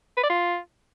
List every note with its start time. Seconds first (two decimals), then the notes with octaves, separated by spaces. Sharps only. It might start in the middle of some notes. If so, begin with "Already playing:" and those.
0.17 B4
0.23 D5
0.30 F4